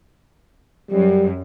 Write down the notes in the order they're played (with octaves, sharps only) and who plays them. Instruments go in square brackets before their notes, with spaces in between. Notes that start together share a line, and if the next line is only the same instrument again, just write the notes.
[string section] F#2 [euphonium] G3